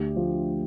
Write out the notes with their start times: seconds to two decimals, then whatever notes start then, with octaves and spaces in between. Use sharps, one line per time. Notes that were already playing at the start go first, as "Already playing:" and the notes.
Already playing: D2 G4
0.16 F3